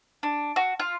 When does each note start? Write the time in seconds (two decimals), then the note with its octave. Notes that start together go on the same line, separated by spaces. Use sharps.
0.23 D4
0.56 F#4
0.80 F4